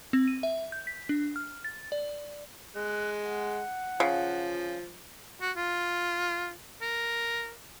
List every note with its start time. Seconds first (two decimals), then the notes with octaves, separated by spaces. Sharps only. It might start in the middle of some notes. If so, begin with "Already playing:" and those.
0.13 C4
0.28 D#7
0.43 E5
0.72 G6
0.87 B6
1.09 D4
1.36 F6
1.65 A6
1.92 D5
2.76 G#3 F#6
3.23 F#5
4.00 C#3 F3
5.41 F#4
5.57 F4
6.82 A#4